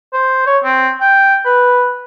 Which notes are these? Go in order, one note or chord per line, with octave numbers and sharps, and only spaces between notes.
C5
C#5
C4
G5
B4